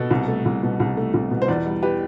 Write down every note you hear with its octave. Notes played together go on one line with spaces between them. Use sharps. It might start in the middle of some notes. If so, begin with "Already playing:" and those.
Already playing: B2 A4
C2
A3
C2
B2
C2
A3
C2
B2
C5
E2 B4 D5
G3
G4 B4